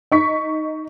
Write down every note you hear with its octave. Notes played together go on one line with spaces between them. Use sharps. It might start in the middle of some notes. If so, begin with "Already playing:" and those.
D#4 C#6 B6